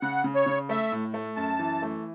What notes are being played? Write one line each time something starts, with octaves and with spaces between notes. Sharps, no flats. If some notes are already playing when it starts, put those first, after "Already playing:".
C#3 F#5
C#3
C#5
C#3
A3 E5
A2
A3
F#2 A5
E3
A3